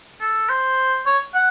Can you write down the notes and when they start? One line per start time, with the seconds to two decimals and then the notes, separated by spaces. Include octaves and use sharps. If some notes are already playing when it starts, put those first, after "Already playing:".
0.21 A4
0.49 C5
1.06 C#5
1.34 F#5